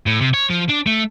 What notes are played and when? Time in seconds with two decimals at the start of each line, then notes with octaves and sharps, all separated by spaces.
0.06 A2
0.21 C3
0.34 C#5
0.50 F3
0.69 D4
0.86 A3